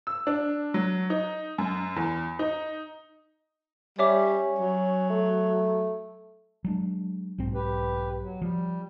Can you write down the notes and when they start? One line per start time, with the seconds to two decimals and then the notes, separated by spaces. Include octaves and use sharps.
0.07 E6
0.27 D4
0.74 F#3
1.10 D#4
1.58 F#2
1.96 E2
2.39 D#4
3.99 G3 C#4 C#5 E5 D6
4.59 F#3
5.10 A3
6.64 F#3 G#3 D4
7.38 B1 G#2 C4
7.54 G4 B4
8.22 F#3
8.42 F3 G3